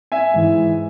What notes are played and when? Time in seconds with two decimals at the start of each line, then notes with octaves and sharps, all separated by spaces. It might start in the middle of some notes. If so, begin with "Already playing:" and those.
0.12 E5 G#5
0.34 G#2 E3